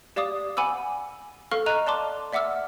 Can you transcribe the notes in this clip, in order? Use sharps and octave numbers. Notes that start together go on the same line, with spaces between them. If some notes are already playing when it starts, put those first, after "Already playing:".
G4 D5 F5 D6 D#6
F#5 G#5 B5 D6 E6
A4 F5 C#6 F6
D#5 A#5 F#6 D#7
D5 A5 C6 D6
D5 E5 F#5 D6 E6 F6